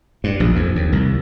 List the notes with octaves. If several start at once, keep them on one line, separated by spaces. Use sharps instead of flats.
G2
A#1
F2
D#2
C2